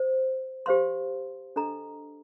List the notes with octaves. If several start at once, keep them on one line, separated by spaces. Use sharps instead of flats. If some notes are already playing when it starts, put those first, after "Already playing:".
Already playing: C5
G4 C5 F5 C6
D4 A4 D#5 A#5